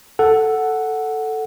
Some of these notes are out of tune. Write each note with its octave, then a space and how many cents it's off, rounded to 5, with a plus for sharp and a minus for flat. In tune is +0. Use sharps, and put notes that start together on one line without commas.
A4 +0 F#5 +0